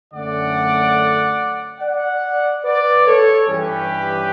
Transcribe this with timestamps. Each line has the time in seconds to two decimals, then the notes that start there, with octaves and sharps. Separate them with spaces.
0.13 F#2 D3 A3 C#4 D5 F#5
1.80 D5 F#5
2.64 B4 D5
3.06 A4 C#5
3.48 G2 E3 G3 C#4 G4 B4